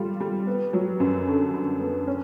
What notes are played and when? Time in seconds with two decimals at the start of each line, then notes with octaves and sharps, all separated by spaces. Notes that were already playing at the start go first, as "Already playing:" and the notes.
Already playing: G3 F4
0.20 G3
0.47 B3
0.73 F#3
1.00 F#2
1.27 D3
1.54 D3
1.80 B3
2.07 C#4